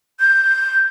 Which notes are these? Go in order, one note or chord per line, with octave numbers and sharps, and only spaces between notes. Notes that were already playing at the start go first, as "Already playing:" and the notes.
G6